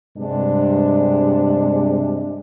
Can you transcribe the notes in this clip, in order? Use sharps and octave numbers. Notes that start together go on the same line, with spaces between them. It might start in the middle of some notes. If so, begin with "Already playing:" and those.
G2 C3 G#3 D4